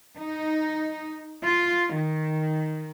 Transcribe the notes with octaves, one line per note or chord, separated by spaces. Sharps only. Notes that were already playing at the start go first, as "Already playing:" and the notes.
D#4
F4
D#3